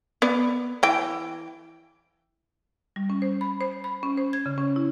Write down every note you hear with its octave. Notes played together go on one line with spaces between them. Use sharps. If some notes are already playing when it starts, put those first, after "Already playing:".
B3 D5
E3 G5
G3
C#4
C5
B5
C5
B5
C#4
C5
G#6
C#3
C#4
E4